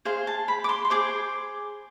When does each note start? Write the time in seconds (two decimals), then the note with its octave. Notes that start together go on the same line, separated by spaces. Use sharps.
0.05 G#4 C5 F5
0.27 A5
0.48 B5
0.64 D6
0.69 C6
0.85 C6
0.90 G#4 C5 D6